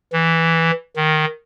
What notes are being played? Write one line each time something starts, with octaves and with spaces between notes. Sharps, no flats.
E3
D#3